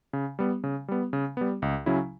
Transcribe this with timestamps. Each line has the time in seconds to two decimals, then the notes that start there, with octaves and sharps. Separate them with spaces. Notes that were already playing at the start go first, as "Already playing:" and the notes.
0.13 C#3
0.39 G3 B3
0.64 C#3
0.88 G3 B3
1.13 C#3
1.37 G3 B3
1.62 C#2
1.86 C#3 F#3 C#4 E4